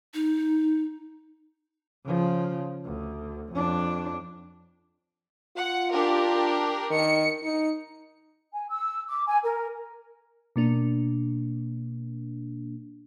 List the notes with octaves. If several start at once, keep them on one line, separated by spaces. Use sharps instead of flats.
D#4
C#3 F3
D2
F2 D4
F4 F#5
D4 G4 A#4
D#3 C#7
D#4 C#7
G#5
E6
D6
G#5
A#4
B2 A#3 D4